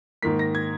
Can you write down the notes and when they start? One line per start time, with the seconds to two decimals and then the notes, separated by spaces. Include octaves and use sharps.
0.22 G#2 D#3 A#3 B6
0.39 A#6
0.55 G#6